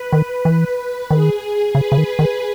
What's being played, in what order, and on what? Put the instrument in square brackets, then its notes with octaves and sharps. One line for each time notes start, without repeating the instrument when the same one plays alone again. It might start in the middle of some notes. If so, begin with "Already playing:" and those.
Already playing: [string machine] B4
[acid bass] D#3 [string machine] B4
[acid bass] E3
[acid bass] D#3 [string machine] G#4
[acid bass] C#3 [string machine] B4
[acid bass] C#3
D#3
D#3